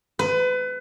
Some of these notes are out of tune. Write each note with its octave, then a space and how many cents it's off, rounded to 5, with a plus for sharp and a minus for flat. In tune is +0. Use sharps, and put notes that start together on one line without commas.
B4 +30